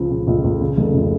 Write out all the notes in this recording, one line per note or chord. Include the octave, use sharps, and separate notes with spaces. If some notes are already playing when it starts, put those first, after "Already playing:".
Already playing: C#2 C#3 F3
C#3
C#2
C#2
C#3
F1
C#3